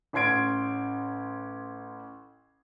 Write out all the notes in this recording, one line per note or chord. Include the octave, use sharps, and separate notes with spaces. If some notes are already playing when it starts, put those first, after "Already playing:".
A1 C#4 C6 G#6 D7